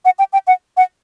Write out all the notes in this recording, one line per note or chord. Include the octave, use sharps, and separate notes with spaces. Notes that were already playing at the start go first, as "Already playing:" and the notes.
F#5
G5
G5
F#5
F#5